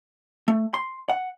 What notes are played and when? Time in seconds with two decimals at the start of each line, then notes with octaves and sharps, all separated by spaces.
0.48 A3
0.74 C6
1.09 F#5